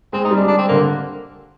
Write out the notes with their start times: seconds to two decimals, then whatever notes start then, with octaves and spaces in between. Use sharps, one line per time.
0.13 G#3 C4
0.25 D#4
0.31 G3
0.37 D4
0.48 D4
0.58 C4
0.69 D3 A#3